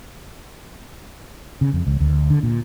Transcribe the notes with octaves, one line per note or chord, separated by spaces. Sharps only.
C#3
F2
C#2
D2
D3
A#2